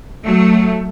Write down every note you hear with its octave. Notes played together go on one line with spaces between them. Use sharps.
F#3 A3